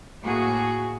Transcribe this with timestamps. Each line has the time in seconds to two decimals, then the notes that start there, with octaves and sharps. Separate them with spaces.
0.23 A2 A#3 F#4 G#4